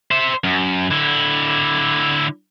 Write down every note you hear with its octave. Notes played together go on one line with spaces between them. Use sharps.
C5 E5
F#2
D3 E4